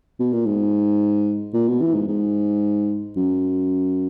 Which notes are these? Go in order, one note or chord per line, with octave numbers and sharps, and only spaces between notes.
B2
A#2
G#2
A#2
B2
E3
G#2
G#2
F#2